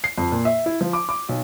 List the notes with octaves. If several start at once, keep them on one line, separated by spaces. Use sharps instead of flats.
C7
F2
A#2
E5
E4
F3
D6
D6
B1